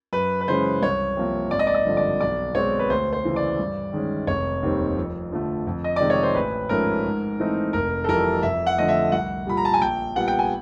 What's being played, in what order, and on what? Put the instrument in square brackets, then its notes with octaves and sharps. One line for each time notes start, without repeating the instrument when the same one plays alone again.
[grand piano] F#2 B4
B4
C#3 E3 G#3 C#4 C5
C2 C#5
C3 F3 A#3
G#1 D5
D#5
D5
D#5
G2 D3 F3
D5
B1 D5
B2 G#3 C4 C#5
B4
D2 C5
C5
C#3 E3
D5
G2
D#3 G#3 C#4
F1 C#5
D#2 D#3 G3 C4
F2
D3 F3 A3
F2
D#5
C3 D#3 G#3 D5
C#5
C5
A1 B4
G#2 F3 A3 C#4 A#4
G#2
E3 A3 C4 D#4
F1 A#4
A4
F2 C3 E3 G3 A#4
F2 E5
F#5
D3 F3 A3 D#5
E5
C2 F#5
A#2 G3 B5
A#5
A5
G#5
A#1 G5
A#2 G3 B3 F#5
G5
G#5